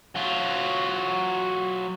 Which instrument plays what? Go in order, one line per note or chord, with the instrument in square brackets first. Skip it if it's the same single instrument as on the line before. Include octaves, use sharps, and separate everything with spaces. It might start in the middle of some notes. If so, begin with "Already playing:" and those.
[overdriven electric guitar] F#3 F4